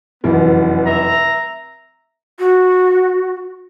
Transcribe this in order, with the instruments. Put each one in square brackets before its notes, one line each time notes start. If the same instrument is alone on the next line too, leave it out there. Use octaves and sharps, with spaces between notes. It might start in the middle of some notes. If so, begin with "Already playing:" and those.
[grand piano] F1 F#2 [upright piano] E3 [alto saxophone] B3
[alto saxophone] E5 [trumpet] A#5
[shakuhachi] F#4